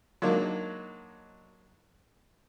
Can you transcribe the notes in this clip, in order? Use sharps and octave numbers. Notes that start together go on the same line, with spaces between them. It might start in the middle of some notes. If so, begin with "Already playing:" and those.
F#3 G#3 A#3 D4 D#4